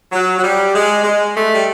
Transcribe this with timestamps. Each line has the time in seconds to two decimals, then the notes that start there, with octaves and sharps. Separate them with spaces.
0.12 F#3
0.38 F#3
0.43 G3
0.74 G#3
1.04 G#3
1.35 A3
1.54 G3